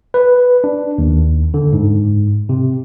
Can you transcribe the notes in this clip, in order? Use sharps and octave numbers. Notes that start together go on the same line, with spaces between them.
B4
D4
D#2
D3
G#2
C3